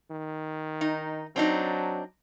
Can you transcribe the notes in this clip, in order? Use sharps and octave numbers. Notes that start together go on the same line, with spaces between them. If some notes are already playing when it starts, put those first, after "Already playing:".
D#3
D#4
F#3 C4 D4 D#4